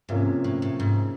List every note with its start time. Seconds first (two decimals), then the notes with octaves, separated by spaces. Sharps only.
0.09 G#2 C3 F3 A#3 C#4
0.44 A2
0.62 A2
0.80 G#2